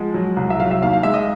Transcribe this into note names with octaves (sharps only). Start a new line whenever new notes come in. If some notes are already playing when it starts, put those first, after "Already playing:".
Already playing: F3 G#3 F#5
F#3
C2
E5
F#3 F5
E5
D#2 F5
F5
G#3 E5
D#5